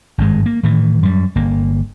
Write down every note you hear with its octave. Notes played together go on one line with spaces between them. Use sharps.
G#1 G2 G#3
A#3
A2 D#3 E3
F#2 G3
G1 A#3